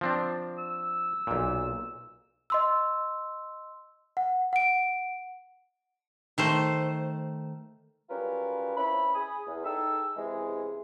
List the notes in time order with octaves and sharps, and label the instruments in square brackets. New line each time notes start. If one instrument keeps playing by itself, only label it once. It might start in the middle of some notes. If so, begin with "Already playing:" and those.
[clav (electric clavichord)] F3 C4 D4
[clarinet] E6
[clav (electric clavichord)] B1 A#2
[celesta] D#5 C6 E6
F#5
F#5 D7
[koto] D#3 A3 C5
[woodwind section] F#3 G3 C#4 F4 A#4 B4
C4 C#4 E4 B5
G#4 G#5 B5 D#6
E2
D#4 G#4 A4 G5 E6
C#2 C3 E3 G#3